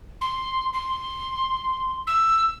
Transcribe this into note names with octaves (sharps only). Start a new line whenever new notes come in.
C6
C6
E6